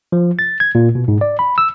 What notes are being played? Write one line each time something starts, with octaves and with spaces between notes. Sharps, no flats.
F3
A6
G#6
A#2
B2
G#2
D5
B5
E6